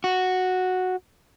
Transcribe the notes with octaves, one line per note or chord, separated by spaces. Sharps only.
F#4